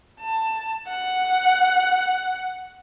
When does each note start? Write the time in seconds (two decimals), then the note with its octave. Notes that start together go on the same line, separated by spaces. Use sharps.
0.21 A5
0.88 F#5